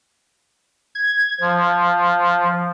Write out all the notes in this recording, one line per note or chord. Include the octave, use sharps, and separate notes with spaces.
G#6
F3